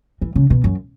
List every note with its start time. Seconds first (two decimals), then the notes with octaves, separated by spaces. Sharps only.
0.21 E3
0.36 C#3
0.50 B2
0.64 F#2